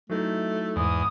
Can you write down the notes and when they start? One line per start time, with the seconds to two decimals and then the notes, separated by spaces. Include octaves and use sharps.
0.10 F#3 A3 D#4 E4
0.76 E2 G#2 D#6